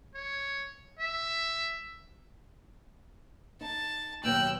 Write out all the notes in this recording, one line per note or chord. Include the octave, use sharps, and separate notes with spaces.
C#5
E5
D#4 A5
D#2 B2 F#3 G5 E6 F#6